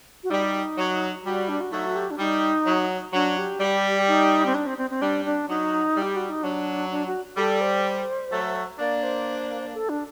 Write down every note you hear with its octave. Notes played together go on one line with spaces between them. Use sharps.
F#4
G3 D#4
F#3
G3 F#4
D4
F#4
F#3 A3 D#4
F#4
G4
D4
G3 D#4
F#3
F#3 D4
G4
G3
D#4
C4
D4
C4
C4
C4
G3 D4
D4
F#3 D#4
G3
G4
F#4
D#4
F#3 D4
D4
F#4
G3 A4
C5
F#3 A3
A#3 D4 D5
C5
A4
D4